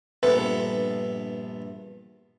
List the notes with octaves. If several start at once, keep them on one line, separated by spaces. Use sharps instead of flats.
A#1 G2 B3 A4 B4 E5